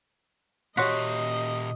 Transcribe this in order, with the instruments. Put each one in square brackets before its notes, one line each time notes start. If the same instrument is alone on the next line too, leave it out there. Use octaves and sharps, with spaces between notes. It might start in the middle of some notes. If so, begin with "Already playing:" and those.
[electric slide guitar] A#2 G4 [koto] F#4 [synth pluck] C#5 C6 B6 [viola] D#5